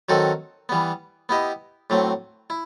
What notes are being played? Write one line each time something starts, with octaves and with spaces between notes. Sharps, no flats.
D#3 F#3 C4 F#4 A4
E3 G3 B3
B3 E4 G4 D#5
A2 F#3 A3 C4
E4